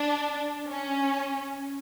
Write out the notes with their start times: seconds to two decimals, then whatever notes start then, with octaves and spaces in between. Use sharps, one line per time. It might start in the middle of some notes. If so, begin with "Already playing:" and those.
Already playing: D4
0.69 C#4